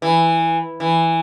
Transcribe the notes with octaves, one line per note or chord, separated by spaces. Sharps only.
E3
E3